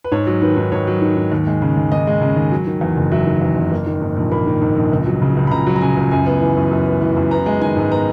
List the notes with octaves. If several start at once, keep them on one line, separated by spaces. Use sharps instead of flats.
B4
G#2 C#5
F#3
D#3 B4
G#2
G#2 C#5
F#3
D#3
G#2
D#2
G#3
C#3
D#2
D#2 D#5
G#3
C#3
D#2
F#3
D#3
E2
F#1
F#3 E5
D#3
E2
F#1
A#3
D#3
G#2
A#1
A#3 B5
D#3
G#2
A#1
C#2
F#3
C#3
C#2
B5
C#2 A#5
F#3
A#5
C#3 G#5
C#2
F#2 G#5
B3
E3
F#2
F#2
B3
E3
F#2
B3 A#5
G#3
D#3 G#5
G#2
B3 A#5